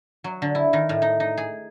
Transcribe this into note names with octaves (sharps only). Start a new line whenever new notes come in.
F#3
D3
E4
D#3
A2
D#4
D#4
G#4